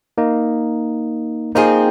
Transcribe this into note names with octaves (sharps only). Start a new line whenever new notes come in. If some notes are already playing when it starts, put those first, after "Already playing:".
A#3 D#4
F3 A#3 C4 D#4 G#4